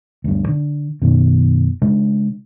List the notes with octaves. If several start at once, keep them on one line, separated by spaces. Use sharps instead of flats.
D2 G2
D3
F#1 F#2 B2 D#3
C#3 G#3 D4